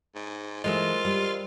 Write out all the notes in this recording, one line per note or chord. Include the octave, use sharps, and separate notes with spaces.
G#2
E3 G#3 A3 F4 A#4 C5 D#5
G3